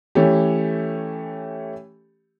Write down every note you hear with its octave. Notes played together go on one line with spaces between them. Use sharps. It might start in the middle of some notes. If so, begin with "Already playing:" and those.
E3 A3 C#4 G4